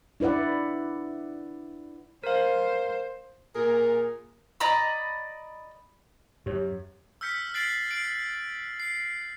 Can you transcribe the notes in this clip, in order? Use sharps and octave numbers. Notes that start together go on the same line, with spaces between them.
D4 E4 B4 D5 F#5
A#4 C5 F5
A#2 G#4 A#4
D5 D#5 A#5 B5
F#2 G4 C#5
E6 F6 G6 B6 C#7
F#6 A6 C7 D7 F#7
C7 D7 F#7
C7